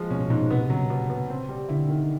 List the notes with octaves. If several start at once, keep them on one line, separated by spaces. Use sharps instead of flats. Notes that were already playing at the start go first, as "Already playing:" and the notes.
Already playing: F3 G#3
B2 C#4
A#2
G#2 B2
C3 B3
C#3 F#3
B2
B2
C4
G3
D3 E4
D#3